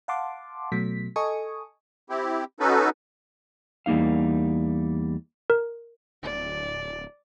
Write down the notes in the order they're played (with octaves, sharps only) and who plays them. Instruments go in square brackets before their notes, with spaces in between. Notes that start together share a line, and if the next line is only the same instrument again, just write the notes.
[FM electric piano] F5 F#5 A5 C6 D6
B2 F#3 A3 B6
A4 D#5 G#5 C#6 D#6
[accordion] C4 E4 G4
C#4 D#4 F#4 A4 B4
[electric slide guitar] E2 G3 A#3 D#4 F5
[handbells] A#4
[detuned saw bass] D1 [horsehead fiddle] D5